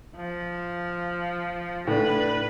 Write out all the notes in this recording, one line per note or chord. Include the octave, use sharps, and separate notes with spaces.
F3
A2 D4 B4